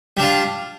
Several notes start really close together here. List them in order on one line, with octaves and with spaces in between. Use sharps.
G3 D4 F4